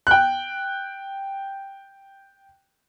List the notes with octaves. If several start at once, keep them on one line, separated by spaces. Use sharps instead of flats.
G5 F#6